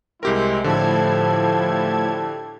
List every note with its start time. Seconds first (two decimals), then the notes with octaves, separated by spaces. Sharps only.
0.23 C2 G#3 C4 E4 G4 A#4
0.64 A2 D3 F3 E4 G4 A4 A5 G#6